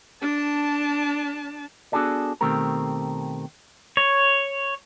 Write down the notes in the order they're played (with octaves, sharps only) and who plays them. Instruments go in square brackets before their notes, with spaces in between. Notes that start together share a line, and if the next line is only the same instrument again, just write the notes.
[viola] D4 A5
[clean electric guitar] B3 D4 F#4 G#4 A4 D5
B2 D#3 A3 C4 G4 A#4
[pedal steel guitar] C#5